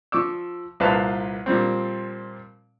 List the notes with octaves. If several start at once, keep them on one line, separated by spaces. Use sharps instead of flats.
F3 C#6 D6 E6
C2 A#2 B4 C5 F5 A5
A#2 F3 G3 C4